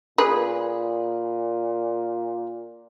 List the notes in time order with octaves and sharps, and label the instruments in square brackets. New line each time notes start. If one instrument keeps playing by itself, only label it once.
[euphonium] A#2 [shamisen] G#4 B4